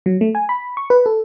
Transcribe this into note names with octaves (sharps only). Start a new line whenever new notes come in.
F#3
A3
G#5
B5
C#6
B4
A4